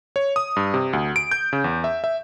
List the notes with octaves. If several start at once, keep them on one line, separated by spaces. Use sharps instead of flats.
C#5
D#6
G2
C3
D2
D7
G6
C#3
E2
E5
E5